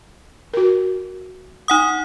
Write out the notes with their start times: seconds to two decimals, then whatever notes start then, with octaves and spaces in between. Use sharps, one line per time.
0.54 F#4 A#4
1.68 D#4 F#5 D#6